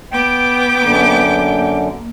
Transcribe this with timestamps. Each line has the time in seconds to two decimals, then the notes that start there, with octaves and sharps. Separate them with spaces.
0.11 B3 G5 D6
0.82 F#2 D3 A#3